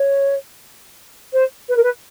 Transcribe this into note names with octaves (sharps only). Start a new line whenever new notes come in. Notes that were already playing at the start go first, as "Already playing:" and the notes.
Already playing: C#5
C5
B4
A#4
B4